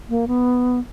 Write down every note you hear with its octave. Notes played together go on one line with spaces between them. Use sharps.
A#3
B3